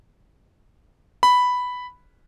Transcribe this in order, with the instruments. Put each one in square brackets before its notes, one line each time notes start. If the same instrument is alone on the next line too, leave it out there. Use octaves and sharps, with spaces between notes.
[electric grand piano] B5